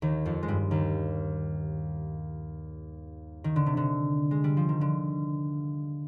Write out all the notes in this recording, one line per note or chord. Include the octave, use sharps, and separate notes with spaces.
D#2 D#3
F2 F3
G#3
G2 G3
D#2 D#3
D#3
D3
C3
D3
G#3
G3
F3
D#3
D3